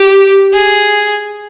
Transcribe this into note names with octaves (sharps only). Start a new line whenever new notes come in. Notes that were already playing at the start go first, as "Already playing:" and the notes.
Already playing: G4
G#4